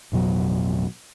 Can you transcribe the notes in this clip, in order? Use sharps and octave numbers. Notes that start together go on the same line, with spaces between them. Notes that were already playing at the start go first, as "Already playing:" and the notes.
A1 F2 B2 F#3